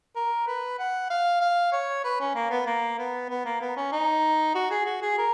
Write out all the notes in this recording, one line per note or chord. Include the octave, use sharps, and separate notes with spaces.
A#4
B4
F#5
F5
F5
C#5
B4
C#4
A#3
B3
A#3
B3
B3
A#3
B3
C#4
D#4
F#4
G#4
F#4
G#4
A#4